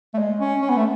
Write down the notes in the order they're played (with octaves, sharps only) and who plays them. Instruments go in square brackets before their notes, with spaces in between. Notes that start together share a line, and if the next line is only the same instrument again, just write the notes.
[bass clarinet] A3
G#3
C#4
C#4
B3
A3